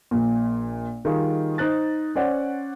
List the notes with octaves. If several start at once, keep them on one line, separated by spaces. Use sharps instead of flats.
A#1 A#2
D#3 G3 F4 G#4
D#4 C5 F#6 A6
C#4 C5 D5 F#5